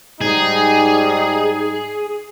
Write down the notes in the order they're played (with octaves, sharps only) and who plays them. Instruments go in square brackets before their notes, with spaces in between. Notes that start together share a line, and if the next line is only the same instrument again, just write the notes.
[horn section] G#2 G3 D#4 [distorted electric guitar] G#4